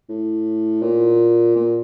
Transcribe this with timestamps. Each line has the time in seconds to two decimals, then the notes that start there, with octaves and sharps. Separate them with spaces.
0.09 A2
0.82 A#2
1.56 A#2